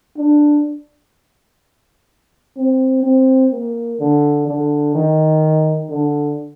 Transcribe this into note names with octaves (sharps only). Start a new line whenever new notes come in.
D4
C4
C4
A#3
D3
D3
D#3
D3